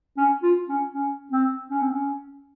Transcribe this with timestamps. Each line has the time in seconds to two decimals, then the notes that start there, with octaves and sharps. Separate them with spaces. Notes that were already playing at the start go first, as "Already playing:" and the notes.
0.17 C#4
0.43 F4
0.69 C#4
0.94 C#4
1.32 C4
1.70 C#4
1.81 C4
1.91 C#4